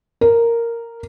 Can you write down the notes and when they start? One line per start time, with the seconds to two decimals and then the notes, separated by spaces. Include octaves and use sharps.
0.21 A#4